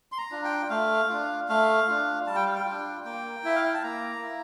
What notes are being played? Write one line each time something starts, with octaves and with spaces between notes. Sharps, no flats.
C6
A#5
D4 F4
G5
A3 F5
D4 F4
A3 F5
D4 F4
G3 A5
G5
F5
G5
D4 F4
A#3 G5
E4 E5
F5
G5
A5
A#3 A#5
E4